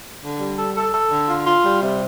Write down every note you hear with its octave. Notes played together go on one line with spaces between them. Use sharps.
D3
G3
A4
A4
A4
D3
F4
F4
G3
C3